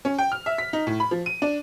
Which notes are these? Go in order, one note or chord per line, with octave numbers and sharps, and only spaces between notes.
C#4
G5
F6
E5
B6
D#4
A2
B5
F3
D#7
D4